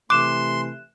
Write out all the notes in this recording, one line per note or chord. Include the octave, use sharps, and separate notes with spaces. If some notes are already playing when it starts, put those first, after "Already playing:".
C3 E3 A3 C6 D6 F#6 E7